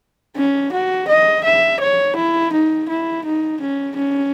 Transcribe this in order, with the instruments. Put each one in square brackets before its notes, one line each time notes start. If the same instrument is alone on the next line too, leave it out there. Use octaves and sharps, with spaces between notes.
[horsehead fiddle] C#4
F#4
D#5
E5
C#5
E4
D#4
E4
D#4
C#4
C#4